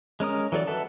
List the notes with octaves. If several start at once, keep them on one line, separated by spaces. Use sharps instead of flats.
G#3 C#4 A#4 D#6
E3 F#3 A4 D5
A4 B4 E5 F#5 A5